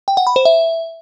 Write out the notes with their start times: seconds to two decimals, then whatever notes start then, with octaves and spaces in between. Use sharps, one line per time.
0.08 G5
0.17 F#5
0.27 B5
0.36 C5
0.45 E5